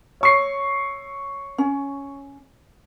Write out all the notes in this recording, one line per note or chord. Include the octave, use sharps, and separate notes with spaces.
C#5 C#6 C7
C#4